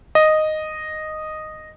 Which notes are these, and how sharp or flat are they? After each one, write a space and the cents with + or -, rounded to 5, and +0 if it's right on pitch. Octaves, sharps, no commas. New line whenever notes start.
D#5 -5